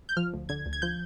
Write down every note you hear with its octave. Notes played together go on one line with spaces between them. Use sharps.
G6
F3 F6
D2
D3 G#6
D2
G#6
F3 G6